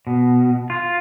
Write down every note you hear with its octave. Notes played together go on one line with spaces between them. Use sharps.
B2
F4